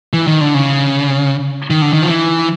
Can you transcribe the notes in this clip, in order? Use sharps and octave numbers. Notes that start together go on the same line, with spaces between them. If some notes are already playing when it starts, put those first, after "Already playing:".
E3
D#3
D3
C#3
D#3
D3
D#3
F3
E3